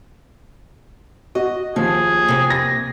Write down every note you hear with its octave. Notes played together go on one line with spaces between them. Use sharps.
F#4 D#5
D#2 F3 G#4
C3 A#3
A#6